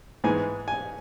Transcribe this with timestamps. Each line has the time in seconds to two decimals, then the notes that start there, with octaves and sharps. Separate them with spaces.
0.24 G#2 E3 G#3 B3 G#5
0.68 G#5